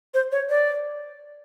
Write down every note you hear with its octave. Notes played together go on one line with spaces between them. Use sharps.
C5
C#5
D5